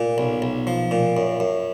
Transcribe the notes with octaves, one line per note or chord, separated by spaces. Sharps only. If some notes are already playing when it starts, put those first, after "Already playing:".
Already playing: A#2
B1
B1
F3
A#2
F#2
F#2